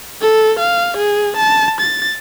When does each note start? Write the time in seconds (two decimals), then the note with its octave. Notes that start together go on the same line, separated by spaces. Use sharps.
0.22 A4
0.59 F5
0.97 G#4
1.36 A5
1.80 A6